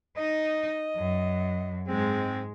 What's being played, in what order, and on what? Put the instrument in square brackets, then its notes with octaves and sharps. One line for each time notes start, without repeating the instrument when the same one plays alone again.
[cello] D#4 [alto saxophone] D#5
[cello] F#2
[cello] G#2 G#3 [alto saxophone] C4